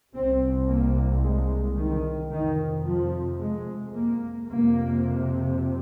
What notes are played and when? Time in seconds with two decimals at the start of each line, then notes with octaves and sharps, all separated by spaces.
0.14 C2 C3 C4
0.68 A#3
1.22 G#3
1.77 D#3
2.31 F2 C3 D#3
2.86 F3
3.40 G#3
3.95 A#3
4.49 F2 C3 A#3